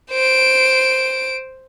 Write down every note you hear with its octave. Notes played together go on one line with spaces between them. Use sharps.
C5 D7